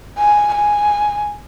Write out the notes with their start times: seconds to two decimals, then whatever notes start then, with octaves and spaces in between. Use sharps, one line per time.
0.18 G#5
0.54 G#5